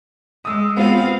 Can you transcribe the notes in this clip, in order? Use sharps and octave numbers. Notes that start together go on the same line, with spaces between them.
G#3 D#6 E6
B3 C4 F4 F5